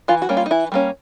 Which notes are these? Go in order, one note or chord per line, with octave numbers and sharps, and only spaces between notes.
E3 F4
F#4
G3 A#3 C#4
F4
D#4
E3 E4
G3 A#3 C#4